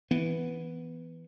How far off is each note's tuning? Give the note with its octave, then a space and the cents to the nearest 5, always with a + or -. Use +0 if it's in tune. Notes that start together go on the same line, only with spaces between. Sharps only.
E3 +0 B3 -5